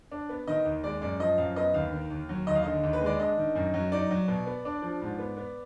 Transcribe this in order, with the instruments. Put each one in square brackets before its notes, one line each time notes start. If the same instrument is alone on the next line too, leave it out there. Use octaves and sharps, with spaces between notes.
[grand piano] D4
B3
D#3 D#5
D#2
G#3 D5
F#2 D5
F3 D#5
F#2 F5
B3 D#5
D#2 F5
D#3
D#2
F#3
D#2 D#5
F5
D3 D#5
D#2
B4
G#3
D5
D4 D#5
D#3
F#2
F#3
D#4 D5
F#3
B2
B3
D4
F3
G#2
B3
B3